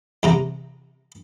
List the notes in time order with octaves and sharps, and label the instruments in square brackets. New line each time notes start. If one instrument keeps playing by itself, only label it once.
[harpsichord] E2 C3 A#5